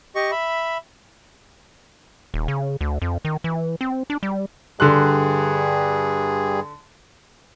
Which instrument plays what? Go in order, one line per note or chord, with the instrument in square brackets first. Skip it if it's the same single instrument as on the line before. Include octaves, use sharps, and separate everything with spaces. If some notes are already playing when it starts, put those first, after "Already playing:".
[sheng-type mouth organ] G4 D#5 C#6
E5 B5
[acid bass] D#1
C#3
D2
F2
D#3
E3
C4
D4
G3
[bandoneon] G2 G3 G#4 [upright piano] D3 C6 F#6